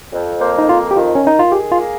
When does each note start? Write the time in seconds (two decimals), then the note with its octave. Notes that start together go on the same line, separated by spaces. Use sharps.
0.13 F2
0.40 A#3 C5
0.59 D#4
0.69 F2 F4
0.91 G4
0.96 D#3 F4
1.15 C#4
1.24 D#3 D#4
1.39 F4
1.52 G4 G#4
1.72 F4
1.80 A#3